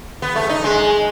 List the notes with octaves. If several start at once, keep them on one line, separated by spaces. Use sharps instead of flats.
B3
A3
D#4
G#3